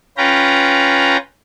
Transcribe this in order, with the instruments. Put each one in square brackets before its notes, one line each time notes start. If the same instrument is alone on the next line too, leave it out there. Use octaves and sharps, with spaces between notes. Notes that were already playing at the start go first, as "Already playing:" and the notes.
[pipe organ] C#4 F4 B4 G5 A#5